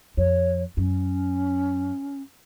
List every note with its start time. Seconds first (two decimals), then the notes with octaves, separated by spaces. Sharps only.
0.17 F2 C#5
0.77 F#2 C#4